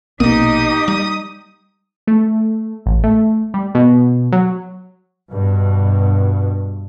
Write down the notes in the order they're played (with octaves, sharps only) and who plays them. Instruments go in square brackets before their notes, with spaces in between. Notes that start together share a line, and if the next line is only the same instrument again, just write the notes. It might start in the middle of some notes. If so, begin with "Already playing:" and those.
[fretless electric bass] A#1 B2 [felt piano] A#3 [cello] D#4 G4 [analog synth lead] D#6
[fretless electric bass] G3
[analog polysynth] A3
A1
A3
G3
B2
F#3
[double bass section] G2 B2